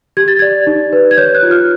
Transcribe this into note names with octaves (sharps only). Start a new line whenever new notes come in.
G4 G#6
A6
D5 G#6
D#4
B4
G#6
C#5 G6
F#6
F4
F6